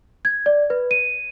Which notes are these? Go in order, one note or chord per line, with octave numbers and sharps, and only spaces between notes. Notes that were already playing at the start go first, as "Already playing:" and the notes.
G#6
D5
B4
D#7